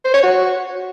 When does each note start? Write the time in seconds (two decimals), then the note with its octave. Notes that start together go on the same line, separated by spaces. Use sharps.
0.05 C5
0.14 C#5
0.23 F#4